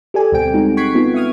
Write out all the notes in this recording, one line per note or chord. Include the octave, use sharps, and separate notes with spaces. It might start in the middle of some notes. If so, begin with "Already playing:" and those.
G4 A4 D5 G#5
D2 B2 G3 C4 G5 D7
G#3 D#4 F#4
C#6 F#6 G#6 B6 C7 D7
B3 D#4 F4
E5 C#6 D#6 F6 G#6